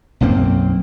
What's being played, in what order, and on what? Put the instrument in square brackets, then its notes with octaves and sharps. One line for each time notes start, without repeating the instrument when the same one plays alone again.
[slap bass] B1 F#2 A#3 C4